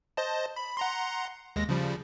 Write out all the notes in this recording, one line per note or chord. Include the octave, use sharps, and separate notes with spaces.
C5 D#5 A5
B5
F#5 A#5 C6
D#2 G#3 A#6
C#3 F3 G3